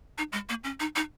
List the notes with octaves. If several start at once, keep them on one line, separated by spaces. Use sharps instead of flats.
D#4
G#3
A#3
C#4
D#4
D#4